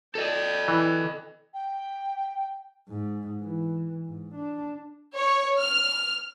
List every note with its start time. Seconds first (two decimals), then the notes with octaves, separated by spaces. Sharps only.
0.15 A4 D5 D#5 G5
0.68 E3
1.53 G5
2.89 G#2
3.42 E3
4.06 G#2
4.35 D4
5.15 C#5
5.58 F6